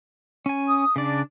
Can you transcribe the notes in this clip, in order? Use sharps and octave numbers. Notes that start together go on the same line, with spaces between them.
C#4 G#5
D#6
C#3 D4 D5